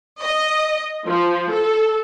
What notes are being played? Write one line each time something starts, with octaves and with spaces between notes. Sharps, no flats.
D#5
F3
A4